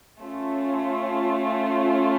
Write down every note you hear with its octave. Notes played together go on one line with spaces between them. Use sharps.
A3 C#4 F4